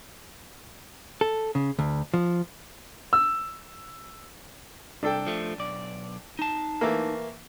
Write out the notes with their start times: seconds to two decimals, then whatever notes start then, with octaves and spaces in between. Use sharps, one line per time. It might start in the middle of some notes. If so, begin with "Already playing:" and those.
1.21 A4
1.55 C#3
1.79 D2
2.14 F3
3.13 E6
5.03 C2 D4 A4 G5
5.27 F3 A3
5.58 B1 D5
6.39 D#4 A5
6.81 E3 A3 A#3